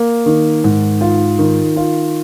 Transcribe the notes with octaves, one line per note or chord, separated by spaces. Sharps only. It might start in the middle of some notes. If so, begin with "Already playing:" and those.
Already playing: A#3
D#3
G#2
F4
D#3
F4